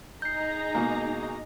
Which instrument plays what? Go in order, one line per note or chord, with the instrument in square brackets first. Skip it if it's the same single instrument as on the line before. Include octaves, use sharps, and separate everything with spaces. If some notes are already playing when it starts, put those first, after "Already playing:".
[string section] D#4 G#4 A#5 [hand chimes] G6 C7
[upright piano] B2 G#3 A#3